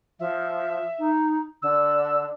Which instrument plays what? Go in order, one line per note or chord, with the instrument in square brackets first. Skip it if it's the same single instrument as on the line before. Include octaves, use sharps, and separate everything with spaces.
[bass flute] F3 [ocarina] E5
[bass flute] D#4
[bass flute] D3 [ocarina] E6